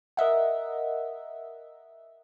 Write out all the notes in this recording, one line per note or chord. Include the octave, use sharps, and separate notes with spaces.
A#4 D#5 E5 F#5